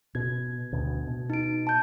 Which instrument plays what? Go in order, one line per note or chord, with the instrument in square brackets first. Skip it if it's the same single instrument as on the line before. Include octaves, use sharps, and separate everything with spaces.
[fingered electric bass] B2 [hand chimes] G#6
[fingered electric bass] D2 B2
B2
[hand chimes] D#4 D7
A5 G6